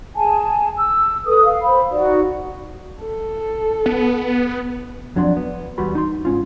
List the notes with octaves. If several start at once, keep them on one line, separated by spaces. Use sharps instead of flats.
G#4 G#5 A5
E6
A4 B4 D#6
F5
C5 B5
D#4 F#4 D5
A4
B3
F2 F#3 D4 D5 C6
B3
E2 G3 B3 F#4 B5 C6
D#4 C6
G#2 C#4 F4